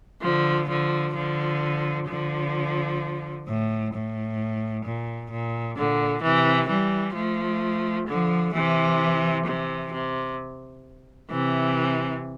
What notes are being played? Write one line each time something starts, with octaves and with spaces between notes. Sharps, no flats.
D3 F3
D3 F3
D3 F3
D3 F3
A2
A2
A#2
A#2
A#2 D3
C3 E3
E3 G3
F3 A3
D3 F3
C3 E3
C3 E3
C3
C3 E3